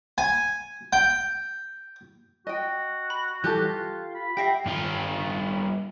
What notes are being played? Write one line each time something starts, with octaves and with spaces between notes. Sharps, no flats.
G#5
G5
F#4 D#5 G5
B5
E3 G3 G4 A4 D6 F#6 G6
F4
B5
G4 E5 F#5 G5 A#6 C7
G2 F4